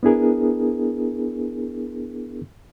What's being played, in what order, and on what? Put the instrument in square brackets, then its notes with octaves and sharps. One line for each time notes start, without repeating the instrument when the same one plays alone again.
[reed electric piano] B3 D4 E4 G#4 A#4